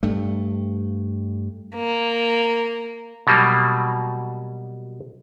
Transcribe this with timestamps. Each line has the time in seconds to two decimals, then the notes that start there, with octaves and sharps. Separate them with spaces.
0.03 G2 A3
1.75 A#3
3.27 B2 F#3 G3 A#3